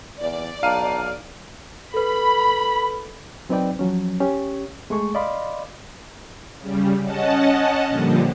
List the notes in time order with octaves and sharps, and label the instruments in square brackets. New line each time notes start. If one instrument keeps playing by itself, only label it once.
[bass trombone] E2 [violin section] D5
[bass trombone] B1 [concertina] D4 D#4 [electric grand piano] F5 D#7
[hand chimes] A4 B4 [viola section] B5
[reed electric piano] F#3 C4 D#4 B4 D5 G5
F3 F#3 C#4
C#4 G4 C#5
G#3 A3 G#4 C#6
D5 D#5 F5 B5 C6 D6
[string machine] C#3 G3
C#4 D#5 F#5 A5
A#2 D3 F3 G3